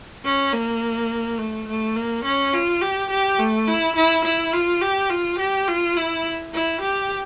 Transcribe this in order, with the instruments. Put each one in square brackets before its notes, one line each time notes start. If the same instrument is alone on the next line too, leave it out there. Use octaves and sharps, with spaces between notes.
[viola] C#4
A#3
A3
A3
A#3
C#4
F4
G4
G4
A3
E4
E4
E4
F4
G4
F4
G4
F4
E4
E4
G4